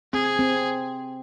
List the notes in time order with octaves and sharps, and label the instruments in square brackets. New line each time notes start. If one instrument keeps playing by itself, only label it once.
[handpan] C4 [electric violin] G#4
[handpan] C4